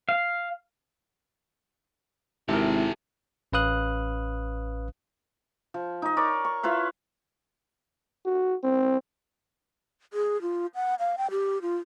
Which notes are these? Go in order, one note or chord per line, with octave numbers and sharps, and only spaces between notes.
F5
G#1 C3 E4 G4 A4 A#4
A1 C#4 B4 F5 D#6 F#6
F3
D#4 D#5
A#4 C#5 D5
C#6
E4 F4 B4 F5
F#4
C4
G#4
F4
F#5
F5
G5
G4
F4